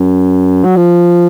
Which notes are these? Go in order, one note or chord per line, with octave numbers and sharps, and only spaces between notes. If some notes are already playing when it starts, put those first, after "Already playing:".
Already playing: F#2
F#3
F3